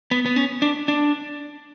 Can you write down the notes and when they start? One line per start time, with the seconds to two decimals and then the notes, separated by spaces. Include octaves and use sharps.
0.11 B3
0.26 B3
0.36 C#4
0.62 D4
0.88 D4